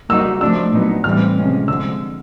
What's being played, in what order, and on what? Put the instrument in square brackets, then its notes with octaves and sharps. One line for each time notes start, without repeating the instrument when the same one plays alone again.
[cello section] G3 A#3 D#4 F#4 [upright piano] E6
[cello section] F3 A3 D4 [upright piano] E6
[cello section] A#2 F#3 B3 D#4
[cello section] A2 E3 G3 C4 [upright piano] F6
[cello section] C3 F3 G#3 C#4
[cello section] D3 F3 G#3 [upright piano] E6